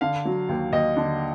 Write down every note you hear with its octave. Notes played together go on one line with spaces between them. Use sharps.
D3 F5
F#3
D#2
D#2 D#5
D3